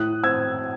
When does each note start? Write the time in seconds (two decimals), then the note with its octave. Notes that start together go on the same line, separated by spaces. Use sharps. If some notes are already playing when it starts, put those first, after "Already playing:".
Already playing: A2 D#6 F#6
0.23 C4 E6 G#6